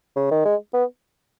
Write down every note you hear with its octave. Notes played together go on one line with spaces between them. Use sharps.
C#3
D#3
G#3
B3